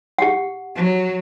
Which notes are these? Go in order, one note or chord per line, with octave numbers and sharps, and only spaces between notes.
G4 F#5
F#3